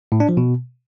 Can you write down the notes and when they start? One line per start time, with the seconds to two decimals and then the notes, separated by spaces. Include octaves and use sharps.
0.12 A2
0.20 D4
0.29 F3
0.37 B2